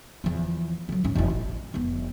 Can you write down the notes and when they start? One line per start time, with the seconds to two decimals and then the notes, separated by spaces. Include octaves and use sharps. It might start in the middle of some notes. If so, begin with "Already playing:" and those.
0.24 E2 F3
0.89 D3 F#3
1.04 G#2 C#4
1.15 E1 E4
1.30 A1
1.74 F1 B3